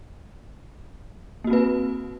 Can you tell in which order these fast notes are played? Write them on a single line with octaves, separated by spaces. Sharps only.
A#3 F#4 C4 B4